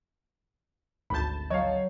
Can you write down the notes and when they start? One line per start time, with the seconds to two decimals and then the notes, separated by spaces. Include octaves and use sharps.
1.10 G#1 D2 A5 B5 G6
1.50 F#3 C#5 D#5 F5